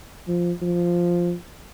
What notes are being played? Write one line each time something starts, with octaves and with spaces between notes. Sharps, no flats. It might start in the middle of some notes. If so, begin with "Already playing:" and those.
F3
F3